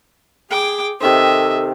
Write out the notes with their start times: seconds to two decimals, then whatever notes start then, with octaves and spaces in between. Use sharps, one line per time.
0.50 G#4 G5 D6
1.00 C3 D#3 A4 C5 D#5 E5